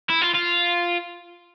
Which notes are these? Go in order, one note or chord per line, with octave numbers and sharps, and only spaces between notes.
E4
F4
F4